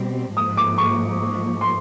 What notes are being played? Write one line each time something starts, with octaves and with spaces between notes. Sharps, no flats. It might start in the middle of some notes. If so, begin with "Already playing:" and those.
Already playing: B2 G3 C4
G#2 F3 A#3 D#6
D6
C#6
C6